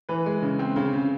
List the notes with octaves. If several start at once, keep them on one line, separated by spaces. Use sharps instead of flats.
E3 B4
G#3
C#3
C4
C#3
C#3